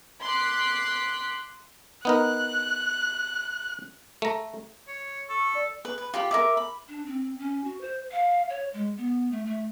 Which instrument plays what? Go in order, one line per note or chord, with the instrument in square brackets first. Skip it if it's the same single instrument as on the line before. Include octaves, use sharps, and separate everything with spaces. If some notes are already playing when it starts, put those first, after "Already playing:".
[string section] C6 D6 F#6 B6 C7
[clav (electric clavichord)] B3 D#4 A#4 [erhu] F#6
[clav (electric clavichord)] A3 A#5
[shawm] C#5
[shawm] A4 [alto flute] C#6
[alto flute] D5
[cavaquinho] B4
B4
F4 G4 B5
A#4 E5 D6
B5
[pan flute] D4
C4
C#4
F#4
C5
F5
C#5
G#3
B3
A3
A3